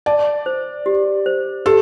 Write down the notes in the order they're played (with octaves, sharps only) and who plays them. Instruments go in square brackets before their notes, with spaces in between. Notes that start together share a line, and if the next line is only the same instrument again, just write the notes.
[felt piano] D5 [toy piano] A5
[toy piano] C5
G4
C5
[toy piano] G4 [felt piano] A4